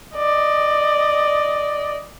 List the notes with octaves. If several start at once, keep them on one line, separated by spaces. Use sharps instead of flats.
D5 D#5